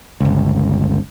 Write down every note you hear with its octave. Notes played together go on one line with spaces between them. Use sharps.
G1 C#2